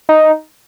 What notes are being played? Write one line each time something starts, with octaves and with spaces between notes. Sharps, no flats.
D#4